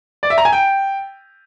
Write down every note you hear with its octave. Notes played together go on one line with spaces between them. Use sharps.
D5
E5
A#5
G#5
G5